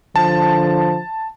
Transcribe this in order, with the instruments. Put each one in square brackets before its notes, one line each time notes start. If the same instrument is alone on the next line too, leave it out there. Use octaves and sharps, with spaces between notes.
[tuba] D3 [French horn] F3 [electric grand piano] A5